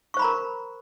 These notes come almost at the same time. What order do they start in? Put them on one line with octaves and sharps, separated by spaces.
C#6 C5 B5 A#5 A#4